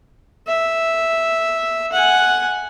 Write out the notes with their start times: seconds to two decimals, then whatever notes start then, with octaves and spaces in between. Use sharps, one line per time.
0.47 E5
1.93 F#5 G#5